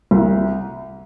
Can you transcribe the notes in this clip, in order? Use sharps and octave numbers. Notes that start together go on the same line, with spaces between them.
C2